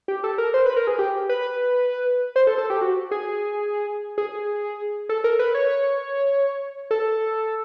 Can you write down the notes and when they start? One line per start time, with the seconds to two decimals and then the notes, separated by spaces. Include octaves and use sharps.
0.08 G4
0.24 A4
0.38 A#4
0.54 C5
0.66 B4
0.76 A#4
0.87 G#4
0.99 G4
1.29 B4
2.36 C5
2.47 A4
2.58 A4
2.70 G4
2.81 F#4
3.11 G#4
4.18 G#4
5.09 A4
5.24 A#4
5.39 B4
5.55 C#5
6.91 A4